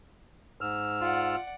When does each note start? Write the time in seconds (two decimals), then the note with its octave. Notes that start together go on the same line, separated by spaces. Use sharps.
0.61 G#2 E6 F6
1.01 F4 D5 F#5